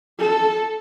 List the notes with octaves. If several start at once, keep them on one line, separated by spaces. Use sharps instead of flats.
A4